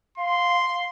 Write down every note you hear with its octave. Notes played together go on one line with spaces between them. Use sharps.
F5 C6